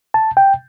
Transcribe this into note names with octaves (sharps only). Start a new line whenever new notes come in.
A5
G5